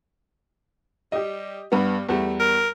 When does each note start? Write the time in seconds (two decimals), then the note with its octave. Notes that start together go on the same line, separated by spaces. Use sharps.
1.12 G3 G4 D#5
1.72 G2 G3 B3
2.09 E2 G3 A3
2.40 A#4